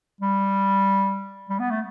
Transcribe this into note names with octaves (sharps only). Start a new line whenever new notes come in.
G3
G3
B3
A3